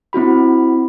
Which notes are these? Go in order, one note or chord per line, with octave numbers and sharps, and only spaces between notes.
C4 E4 F#4 B5